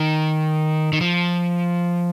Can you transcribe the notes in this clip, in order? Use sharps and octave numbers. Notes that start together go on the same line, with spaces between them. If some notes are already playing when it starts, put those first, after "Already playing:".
Already playing: D#3
D#3
F3